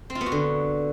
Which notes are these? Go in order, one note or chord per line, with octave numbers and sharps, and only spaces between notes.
C4
F4
B3
F#4
D3